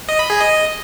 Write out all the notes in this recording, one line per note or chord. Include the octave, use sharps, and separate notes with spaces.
D#5
B5
G#4
D#5